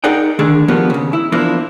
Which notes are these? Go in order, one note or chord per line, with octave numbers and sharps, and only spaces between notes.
D#4 G#4 A#4 D5 F#5 G5
D3 D#3 A3 D4 G#4
F3 G3 A#3 B3 F#4
D#2 C#3
E4
E2 F3 A#3 D4 E4